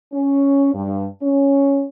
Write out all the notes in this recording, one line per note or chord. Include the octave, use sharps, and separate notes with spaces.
C#4
G2
C#4